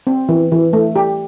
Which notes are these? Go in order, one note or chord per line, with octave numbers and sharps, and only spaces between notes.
C4
E3
E3
A3
G4